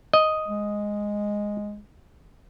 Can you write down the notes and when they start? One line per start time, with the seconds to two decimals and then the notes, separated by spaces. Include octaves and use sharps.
0.13 D#5
0.48 G#3